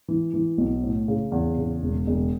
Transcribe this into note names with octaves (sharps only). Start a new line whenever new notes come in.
E3
E3
B1
A2
C#3
E2
C#3
E1
E1